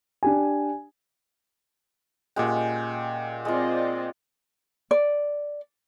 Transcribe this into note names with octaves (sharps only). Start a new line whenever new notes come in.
D4 G4 G#5
A#2 G#3 C#4 G4 F#5 G5
G#3 C4 F4 D5 D#5
D5